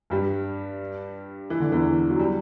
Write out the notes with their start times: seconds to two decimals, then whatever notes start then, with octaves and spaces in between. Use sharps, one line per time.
0.10 G2 G3
1.50 E3
1.60 D3
1.72 E2 E3
2.10 F#3
2.19 G3